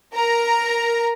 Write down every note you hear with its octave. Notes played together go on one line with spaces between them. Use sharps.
A#4 A#5